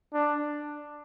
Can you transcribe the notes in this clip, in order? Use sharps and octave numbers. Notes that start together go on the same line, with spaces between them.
D4